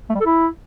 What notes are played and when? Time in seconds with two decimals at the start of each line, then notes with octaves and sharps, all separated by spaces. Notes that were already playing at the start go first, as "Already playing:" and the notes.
0.09 A3
0.15 G3
0.20 A4
0.25 E4